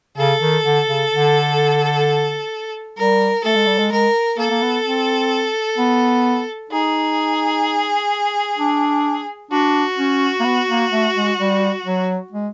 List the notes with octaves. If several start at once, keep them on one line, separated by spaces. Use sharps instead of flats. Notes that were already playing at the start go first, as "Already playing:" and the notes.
C#3 A4
D#3
D3
C#3
D3
G3 A#4
A3 A4
G#3
G3
G#3
G#3 A#4
A#3 A4
A#3
B3
C4
B3
D#4 G#4
D4
D4 F#4
C#4
A#3
B3
A#3
A3
G#3
G3
F#3
G#3